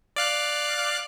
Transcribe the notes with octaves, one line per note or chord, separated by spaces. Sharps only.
D5 F5 F#6